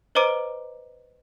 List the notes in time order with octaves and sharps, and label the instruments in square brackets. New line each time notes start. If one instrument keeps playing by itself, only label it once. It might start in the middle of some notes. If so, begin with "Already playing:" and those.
[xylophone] B4 C5 D#5 A#5 D6 D7